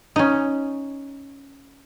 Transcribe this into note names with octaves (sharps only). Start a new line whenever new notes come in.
C#4 D#4